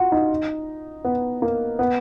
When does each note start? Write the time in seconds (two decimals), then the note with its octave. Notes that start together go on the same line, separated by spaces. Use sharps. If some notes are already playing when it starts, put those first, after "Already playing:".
Already playing: F4 F#4
0.12 D#4
1.05 B3
1.42 A#3
1.79 B3